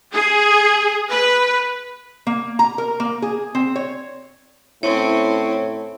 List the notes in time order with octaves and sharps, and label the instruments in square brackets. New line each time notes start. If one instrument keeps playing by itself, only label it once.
[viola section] G#4
B4
[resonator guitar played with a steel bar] A#3
A#5
A#4
A#3
G#4
C4
C#5
[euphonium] A2 [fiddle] C4 C#4 [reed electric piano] E4 [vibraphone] C#5